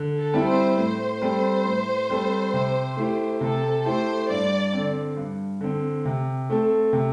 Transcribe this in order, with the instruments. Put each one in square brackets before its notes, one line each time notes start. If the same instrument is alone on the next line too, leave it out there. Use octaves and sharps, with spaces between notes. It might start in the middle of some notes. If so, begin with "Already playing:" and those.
Already playing: [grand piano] D3
[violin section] A4
[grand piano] G3 C4 E4
[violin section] C5
[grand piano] A2 [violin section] C5
[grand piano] G3 C4 A4
A2
G3 C4 A4
C3
A3 E4 G4
[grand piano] C3 [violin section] A4
[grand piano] A3 E4 G4 [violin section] C5
[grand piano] G2 [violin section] D5
[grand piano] D3 C4
G2
D3 C4
C3
A3 C4 A4
C3